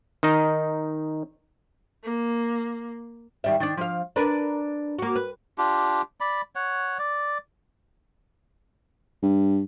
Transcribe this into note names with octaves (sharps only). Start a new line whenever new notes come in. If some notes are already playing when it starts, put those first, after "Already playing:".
D#3 D#4
A#3
D#3 G3 E5
D#3 D4
F3 F5
D4 A#4 B4
A#3 F#4
B4
D4 F4 G4
D5 B5
C#5 F#5
D5
G2